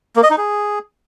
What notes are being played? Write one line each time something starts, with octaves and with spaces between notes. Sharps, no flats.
A#3
D#5
D#4
G#4